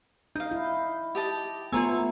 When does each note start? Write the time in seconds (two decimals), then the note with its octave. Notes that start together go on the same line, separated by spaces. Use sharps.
0.36 D#4 D#5 F5 G6
0.51 E4
1.15 G4 D#5 A5
1.72 A3 B3 F4 C5 C#5 G#5 A#5 E6